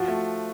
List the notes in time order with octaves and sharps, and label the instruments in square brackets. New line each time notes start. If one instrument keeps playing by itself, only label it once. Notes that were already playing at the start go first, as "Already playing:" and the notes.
Already playing: [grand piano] F3 [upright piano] F#4
[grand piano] A3